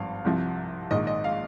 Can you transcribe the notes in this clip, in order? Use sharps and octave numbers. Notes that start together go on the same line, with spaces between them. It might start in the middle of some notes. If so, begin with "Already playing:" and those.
Already playing: G#1 G2 F3 F5
C2 C3 F3
A#1 G#2 D#3 D#5
D#5
F5